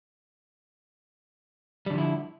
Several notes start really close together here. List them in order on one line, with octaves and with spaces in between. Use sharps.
G3 D3 F3 E4